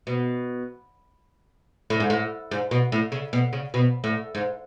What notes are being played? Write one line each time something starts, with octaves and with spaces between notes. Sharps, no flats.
B2
A2
G#2
A2
G#2
B2
A2
C#3
B2
C#3
B2
A2
G#2